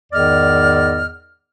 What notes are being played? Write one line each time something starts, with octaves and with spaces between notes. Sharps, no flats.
E2 G#2 D#3 D5 D#5 F6